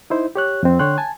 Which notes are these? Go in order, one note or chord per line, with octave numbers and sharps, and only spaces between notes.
D#4 E4 C5
G4 C#5 F#6
F2 C4
D3 C#5 G5 C6 F#6
G#5 A5